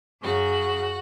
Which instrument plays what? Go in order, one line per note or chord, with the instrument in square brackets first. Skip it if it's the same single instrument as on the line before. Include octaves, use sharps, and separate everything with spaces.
[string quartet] F#2 C#3 F#3 F#4